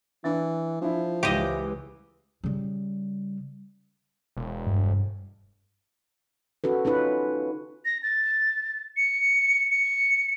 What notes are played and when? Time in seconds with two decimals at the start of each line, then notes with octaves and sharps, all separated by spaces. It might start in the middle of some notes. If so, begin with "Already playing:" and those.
0.24 E3 D4 A6
0.81 F3 D4 E4
1.23 C#2 E3 E4 F4 G4 C5 D#5
2.44 C#3 G3
4.37 E1
4.66 G2
6.64 C#4 F#4 A4 B4
6.85 C#4 D#4 F4 B4
7.85 A#6
8.03 A6
8.97 C#7
9.71 C#7